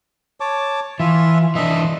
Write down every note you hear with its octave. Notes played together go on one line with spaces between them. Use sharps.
C#5 A5 D6
E3 F4 E5
E3 D4 D#5 E5